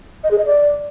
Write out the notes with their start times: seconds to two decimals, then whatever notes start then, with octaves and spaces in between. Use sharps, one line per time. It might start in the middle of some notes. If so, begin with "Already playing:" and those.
0.24 D#5
0.31 G#4
0.38 D#5
0.46 D5